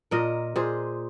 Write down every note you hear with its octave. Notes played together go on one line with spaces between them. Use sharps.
A#2 A#4 D#5
A#2 G#4 C5